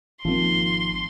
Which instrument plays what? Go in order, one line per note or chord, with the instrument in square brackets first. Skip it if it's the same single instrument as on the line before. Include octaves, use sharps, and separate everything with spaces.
[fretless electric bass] G#1 A#3 C4 [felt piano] D#3 F3 [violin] C6